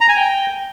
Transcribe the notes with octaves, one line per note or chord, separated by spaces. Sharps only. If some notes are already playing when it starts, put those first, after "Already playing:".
A#5
G#5
G5